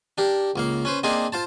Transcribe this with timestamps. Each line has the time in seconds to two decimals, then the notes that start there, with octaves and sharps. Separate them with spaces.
0.18 D4 G4 A#4
0.56 C#2 A#3 F5
0.85 C#4 B4 C5
1.03 A#3 C4 D4 G#4 C5 D#5
1.32 F4 C5 A5